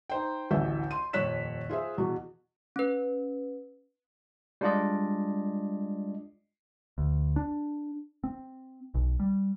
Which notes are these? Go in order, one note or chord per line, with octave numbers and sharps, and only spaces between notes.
D#4 C5 G5
A1 D2 E3 E5 G6
C6 D#7
D#1 F2 C#5 F#6 B6 E7
F4 G#4 C5 E5
E2 B2 F#4
C#4 B4
G3 G#3 D4 F4 D5 D#5
D2
D4
C4
B1
G3